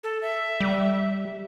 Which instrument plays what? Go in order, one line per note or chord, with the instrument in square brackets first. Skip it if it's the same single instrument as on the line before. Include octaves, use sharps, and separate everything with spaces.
[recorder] A4
E5
[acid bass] G3